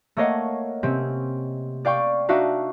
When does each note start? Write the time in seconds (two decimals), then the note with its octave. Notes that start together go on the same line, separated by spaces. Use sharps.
0.17 A3 A#3 C#5 D#5 F5 F#5
0.83 C3 C4 C#4
1.85 D5 F5 G5 C#6
2.29 D4 D#4 F#4 E5 F5